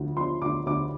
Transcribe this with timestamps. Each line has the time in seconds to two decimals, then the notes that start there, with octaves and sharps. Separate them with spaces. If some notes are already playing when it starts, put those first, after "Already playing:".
Already playing: D2 D3 F3
0.17 F3 C6
0.42 D2 D6
0.66 D2 D6